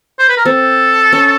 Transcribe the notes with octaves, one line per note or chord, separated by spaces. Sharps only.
C5
B4
A#4
C4 A4
C#4